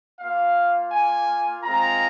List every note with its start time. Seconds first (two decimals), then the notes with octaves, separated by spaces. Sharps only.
0.20 A#3 F4 F5
0.92 G#5
1.63 G#3 C4 F4 A#5